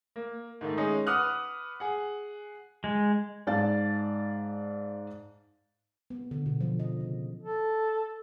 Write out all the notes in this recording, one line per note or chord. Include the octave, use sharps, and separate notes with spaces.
A#3
G#2 D#3 A3
G#3 C#4 D#4
B4 F#5 D6 D#6 F6 F#6
G#4 F#5
G#3
G#2 D5 F5 A5 A6
B3
D3
B2
F3
D#5
C#3
A4